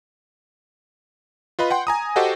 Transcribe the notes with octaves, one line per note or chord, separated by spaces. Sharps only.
F4 B4 D#5 B5
F#5 G5 C6
G#5 A#5 D#6
F#4 G4 A4 C5 D#5 F#5